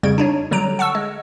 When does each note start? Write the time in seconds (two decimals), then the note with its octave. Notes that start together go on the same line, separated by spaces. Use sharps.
0.03 F2 C#3 G3 G#6 D7
0.18 D4 D#4 C#5
0.51 D3 F#3 G3 A#5 D7
0.79 F#5 A5 C#6 E6
0.95 G#3